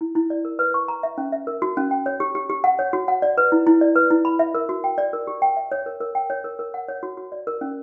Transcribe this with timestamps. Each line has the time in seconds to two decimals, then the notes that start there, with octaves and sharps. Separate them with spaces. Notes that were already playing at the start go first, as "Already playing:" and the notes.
0.01 E4
0.15 E4
0.30 D5
0.45 A#4
0.59 B4
0.74 C#6
0.88 A#5
1.03 E5
1.18 C#4
1.32 E5
1.47 A#4
1.62 F#4
1.77 C#4
1.91 G5
2.06 C#5
2.20 G4
2.35 G4
2.50 G4
2.64 F#5
2.79 C#5
2.93 F#4
3.08 F#5
3.22 D5
3.38 B4
3.52 E4
3.67 E4
3.81 D5
3.96 B4
4.11 E4
4.25 B5
4.39 E5
4.55 A#4
4.69 F#4
4.84 G5
4.98 D5
5.13 A#4
5.27 G4
5.42 G5
5.56 E5
5.72 C#5
5.86 A#4
6.01 A#4
6.15 G5
6.30 C#5
6.44 A#4
6.59 A#4
6.74 F#5
6.88 C#5
7.03 F#4
7.17 F#4
7.32 D5
7.47 A#4
7.61 C#4